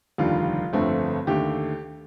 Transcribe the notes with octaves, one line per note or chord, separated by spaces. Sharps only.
F1 D#2 D3 G3 F4
G1 F2 D3 A3 C4
D#2 D3 A3 G4